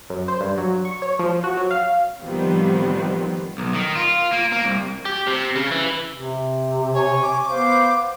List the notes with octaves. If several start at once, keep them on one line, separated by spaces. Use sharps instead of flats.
F#2
C5
G2
F#3
C#6
C#5
F3
F#4
F#3
F5
A2 D#3 F3 G3 B3 C4
B1
D#3
F4
A#3
A#3
C2
G4
C3
C#3
E3
C3
C#5 G#5 C#6
D6
B3 C5 F5 C6